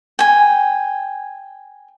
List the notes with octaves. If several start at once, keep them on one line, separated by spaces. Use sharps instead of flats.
G5 G#5